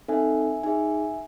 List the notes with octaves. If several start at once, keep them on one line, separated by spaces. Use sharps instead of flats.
C4 D#4 A4 E5 G#5
D#4 G#4 E5 G#5